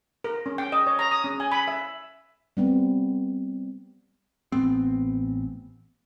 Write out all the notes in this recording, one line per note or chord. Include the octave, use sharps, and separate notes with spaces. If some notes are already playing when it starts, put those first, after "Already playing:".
A#4
C#4
G5
D#5
C#5
A#5
D#6
C#4
G#5
B5
E5
G3 B3 C4
A1 B3 C4